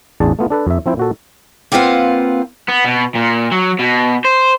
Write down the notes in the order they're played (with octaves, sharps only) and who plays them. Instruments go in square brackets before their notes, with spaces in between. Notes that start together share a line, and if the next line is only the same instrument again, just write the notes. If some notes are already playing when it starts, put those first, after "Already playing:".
[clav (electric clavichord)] A1 E2 D4 G#4 A5
A3 B3 F4
D4 A4 B4
F2 E5
F3 C4 E4 G5
A#2 F#4 A4
[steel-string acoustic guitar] A#3 C4 F4 B4 F5 F#5
[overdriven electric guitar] B3
B2
A#2
F#3
B2
C5